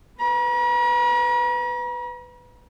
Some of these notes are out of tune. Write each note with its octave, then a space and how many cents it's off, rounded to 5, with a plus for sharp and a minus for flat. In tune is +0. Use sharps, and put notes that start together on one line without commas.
B4 +20 A#5 +45